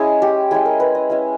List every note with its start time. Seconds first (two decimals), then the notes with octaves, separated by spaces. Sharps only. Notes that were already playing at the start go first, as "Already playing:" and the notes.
Already playing: G#3 C#4 E4 G#4
0.22 G4
0.51 G#3 C#4 E4 G#4
0.65 A#4
0.80 B4
0.95 D#5
1.10 G#3 C#4 E4 E5